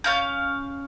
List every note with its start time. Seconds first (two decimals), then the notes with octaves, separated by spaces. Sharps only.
0.04 C#4 F5 G6